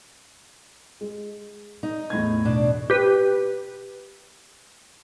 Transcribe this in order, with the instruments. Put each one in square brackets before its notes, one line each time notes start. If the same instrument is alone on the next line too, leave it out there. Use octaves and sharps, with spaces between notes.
[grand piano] G#3
[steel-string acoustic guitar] D#4
[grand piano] E2 A2 G#6
[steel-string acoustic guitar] B2 D4
[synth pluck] G4 B4